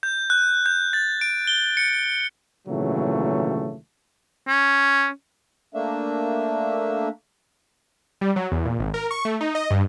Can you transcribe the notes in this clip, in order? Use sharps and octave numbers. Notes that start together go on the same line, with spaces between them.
G6
F#6
G6
A6
D7
G7
C#7
G#1 A#2 C#3 E3 F#3 A3
C#4
A3 A#3 D4 E5
G3
F#3
E2
A#2
G#1
A#4
C#6
A3
D#4
D#5
G2